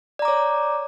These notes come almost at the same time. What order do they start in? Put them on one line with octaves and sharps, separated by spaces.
D5 A#5 D6 C#5